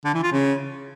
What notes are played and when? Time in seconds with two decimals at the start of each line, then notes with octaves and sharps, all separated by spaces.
0.05 D3
0.14 E3
0.23 F4
0.32 C#3